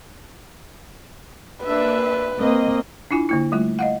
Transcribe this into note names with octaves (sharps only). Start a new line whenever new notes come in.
A#3 D4 B4 E5
A#3 C4 D#5
D4 E4 F4 G#5
D3 A#3 E4
G3 A3 F4
D#5 F5 F#5